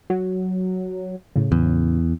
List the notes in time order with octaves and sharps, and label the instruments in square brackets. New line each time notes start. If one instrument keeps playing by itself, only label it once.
[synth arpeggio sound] F#3
A2 C#3
[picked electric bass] E2